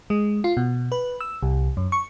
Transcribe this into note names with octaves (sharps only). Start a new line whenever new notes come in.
G#3
F4
B2
B4
E6
C2
F#2
C#6